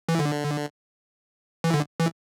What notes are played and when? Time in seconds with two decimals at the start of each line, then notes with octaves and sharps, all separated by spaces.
0.09 E3
0.19 D3
1.64 E3
1.74 D3
2.00 E3